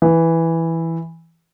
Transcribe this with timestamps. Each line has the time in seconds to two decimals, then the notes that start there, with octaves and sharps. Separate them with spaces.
0.02 E3